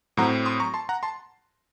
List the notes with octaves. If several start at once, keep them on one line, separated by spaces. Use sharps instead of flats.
A2 F#3 C4 F#5 A#5
C6 D#6
A#5 C#6
A5 C6
F#5 A#5
A5 C6